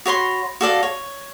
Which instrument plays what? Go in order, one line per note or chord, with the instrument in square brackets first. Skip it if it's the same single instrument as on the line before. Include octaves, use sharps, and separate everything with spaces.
[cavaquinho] F#4 C#5 B5 C6
F#4 A4 D5 F5
C#5